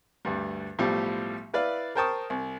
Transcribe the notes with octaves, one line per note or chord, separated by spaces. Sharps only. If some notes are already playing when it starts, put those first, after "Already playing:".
D2 G2 G3
B1 A2 F3 G3 G4 D6
E4 B4 D5 F5
A#4 C5 G5 A5 C#6 D#6
C2